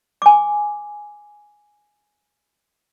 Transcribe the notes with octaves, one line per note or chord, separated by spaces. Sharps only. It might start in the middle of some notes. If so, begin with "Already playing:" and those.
G#5 D6